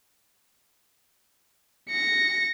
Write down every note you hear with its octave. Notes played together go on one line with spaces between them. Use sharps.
A#6 C#7